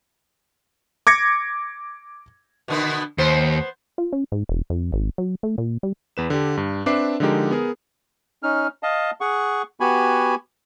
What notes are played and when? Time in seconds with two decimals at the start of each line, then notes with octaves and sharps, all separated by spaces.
1.07 D6 G#6 A#6 C#7
2.68 B2 D3 B3
3.18 D#2 B3 C5
3.98 F4
4.13 C#4
4.32 G#2
4.49 E1
4.70 F2
4.92 G#1
5.18 F#3
5.43 A3
5.58 A#2
5.83 G3
6.17 E2 B4 E7
6.30 D3 G4
6.57 G2
6.86 C4 D4 B4 E5 D6 C7
7.20 D3 F3 G#3 D#4 G4 A#4
7.51 B3 G#4 A#4
8.43 C#4 D#4 F6
8.83 D#5 F5 A5
9.21 G#4 F#5 C#6
9.80 B3 F#4 G4 G#5 B5